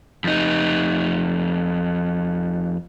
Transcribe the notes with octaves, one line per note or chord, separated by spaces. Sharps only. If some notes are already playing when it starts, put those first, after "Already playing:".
F2 D#4